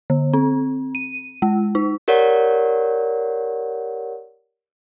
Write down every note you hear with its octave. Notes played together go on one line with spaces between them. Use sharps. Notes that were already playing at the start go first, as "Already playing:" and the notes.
D3
C4
D#7
G#3
D#4
G4 A#4 C#5 D5 F#5